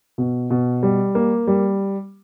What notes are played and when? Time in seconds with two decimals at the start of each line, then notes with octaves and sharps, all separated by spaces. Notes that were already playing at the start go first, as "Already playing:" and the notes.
0.18 B2
0.50 B2
0.83 G3
1.15 A#3
1.47 G3